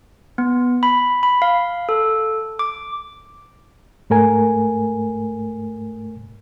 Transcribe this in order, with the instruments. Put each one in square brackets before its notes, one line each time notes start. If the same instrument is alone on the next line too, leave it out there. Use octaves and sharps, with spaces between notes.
[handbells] B3
B5
B5
F5
A4
D6
[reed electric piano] G#2 A3 A#4 G#5